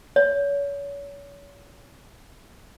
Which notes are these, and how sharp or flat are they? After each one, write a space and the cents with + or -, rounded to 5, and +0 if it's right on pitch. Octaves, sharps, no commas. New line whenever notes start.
C#5 +35